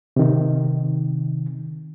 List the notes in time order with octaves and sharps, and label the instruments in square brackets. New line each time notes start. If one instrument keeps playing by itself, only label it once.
[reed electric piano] C3 D#3